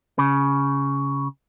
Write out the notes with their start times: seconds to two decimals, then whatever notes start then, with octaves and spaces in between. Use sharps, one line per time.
0.18 C#3